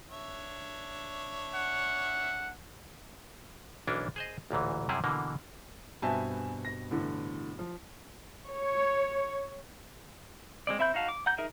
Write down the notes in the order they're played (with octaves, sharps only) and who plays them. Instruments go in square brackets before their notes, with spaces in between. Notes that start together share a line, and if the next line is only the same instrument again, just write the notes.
[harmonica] D4 C#5 E5
[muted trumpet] F#5
[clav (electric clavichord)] B1 E3 A#3 C#4 D4
G#4 C5 D#5
A1 D2 A#2 E3
F#2 C3 G3 E4 G#4
B2 D3 E3 A#3
[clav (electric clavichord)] G2 B2 C4 [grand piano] E5 G#5 A5
[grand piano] A#6
A2 D3 E3
F3
[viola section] C#5
[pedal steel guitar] G#3 C4 D5
C4 E4 E5 B5 G6
D#4 F#4 F5 A5
D6
F#5 A#5 G6
D#4 G#4 A#4 E5